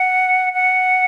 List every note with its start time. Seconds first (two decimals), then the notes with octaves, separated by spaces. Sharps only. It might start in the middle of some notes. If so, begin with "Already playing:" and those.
Already playing: F#5
0.53 F#5